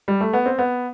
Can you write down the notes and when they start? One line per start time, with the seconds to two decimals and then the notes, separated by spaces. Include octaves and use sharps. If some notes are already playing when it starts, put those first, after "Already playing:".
0.08 G3
0.21 A3
0.33 B3
0.46 C4
0.59 B3